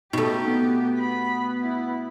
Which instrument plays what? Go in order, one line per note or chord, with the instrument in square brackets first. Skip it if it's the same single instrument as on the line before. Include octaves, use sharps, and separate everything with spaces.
[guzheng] B2 A3 [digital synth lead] D#4 [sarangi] G4
[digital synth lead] B3
[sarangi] B5
E4